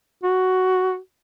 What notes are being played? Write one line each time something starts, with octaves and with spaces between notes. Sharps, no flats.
F#4